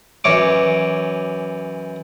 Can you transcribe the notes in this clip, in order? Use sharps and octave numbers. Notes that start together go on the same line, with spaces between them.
F#2 E3 C#5 D6